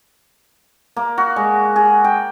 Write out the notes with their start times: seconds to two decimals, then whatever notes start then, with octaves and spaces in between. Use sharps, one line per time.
0.96 A#3
1.18 F#4
1.36 G#3
1.76 G#4
2.04 G5